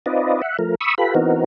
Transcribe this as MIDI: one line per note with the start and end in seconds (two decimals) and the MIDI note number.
0.06 0.41 60
0.06 0.41 63
0.06 0.41 65
0.06 0.41 71
0.06 0.41 74
0.06 0.41 75
0.42 0.57 76
0.42 0.57 78
0.59 0.75 53
0.59 0.75 57
0.59 0.75 70
0.81 0.95 83
0.81 0.95 85
0.81 0.95 87
0.81 0.95 88
0.98 1.15 65
0.98 1.15 67
0.98 1.15 69
0.98 1.15 71
0.98 1.15 83
1.15 1.44 52
1.15 1.44 59
1.15 1.44 60
1.15 1.44 63
1.15 1.44 66
1.15 1.44 70